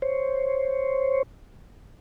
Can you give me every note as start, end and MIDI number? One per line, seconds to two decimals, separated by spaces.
0.02 1.23 72
0.02 1.23 73